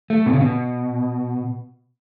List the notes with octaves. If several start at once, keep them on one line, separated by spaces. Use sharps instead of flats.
A3
B2
C#3
B2